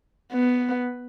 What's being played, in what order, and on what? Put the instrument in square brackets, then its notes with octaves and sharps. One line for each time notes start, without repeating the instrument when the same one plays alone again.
[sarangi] B3